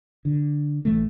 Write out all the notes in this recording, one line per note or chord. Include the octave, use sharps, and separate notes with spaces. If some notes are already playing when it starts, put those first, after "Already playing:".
D3
A1 A2 E3 A3